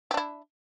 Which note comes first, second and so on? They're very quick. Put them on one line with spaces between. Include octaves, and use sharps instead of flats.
G4 D4 E4